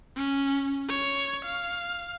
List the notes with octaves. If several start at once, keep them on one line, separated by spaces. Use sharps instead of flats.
C#4
C#5
F5